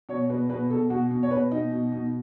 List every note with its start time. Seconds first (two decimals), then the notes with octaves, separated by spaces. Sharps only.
0.09 B2 C#5
0.30 B2 B4
0.49 B2 B4
0.70 B2 A4
0.90 B2 F#4
1.11 B2
1.23 C#5
1.31 B2 B4
1.51 B2 D#4
1.72 B2
1.92 B2